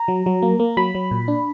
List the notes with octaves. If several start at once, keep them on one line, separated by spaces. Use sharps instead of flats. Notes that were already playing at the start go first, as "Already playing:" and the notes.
Already playing: A#5
F#3
F#3
A#3
A#3
F#3 B5
F#3
A#2
D4